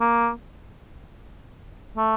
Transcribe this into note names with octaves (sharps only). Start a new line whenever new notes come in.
A#3
A3